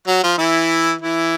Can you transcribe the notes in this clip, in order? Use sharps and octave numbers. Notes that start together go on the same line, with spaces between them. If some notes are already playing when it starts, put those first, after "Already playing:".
F#3 F#4
F3 F4
E3 E4
E3 E4